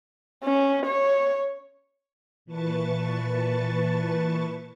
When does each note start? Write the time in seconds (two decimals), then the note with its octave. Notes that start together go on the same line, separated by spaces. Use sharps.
0.44 C#4
0.86 C#5
2.45 A#2 E3 B4 A5 C#6 A6